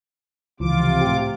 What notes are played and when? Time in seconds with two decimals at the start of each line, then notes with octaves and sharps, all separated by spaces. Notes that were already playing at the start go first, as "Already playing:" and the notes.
0.60 C#2 C3 E3 F3 F4 D6
1.01 A2 G4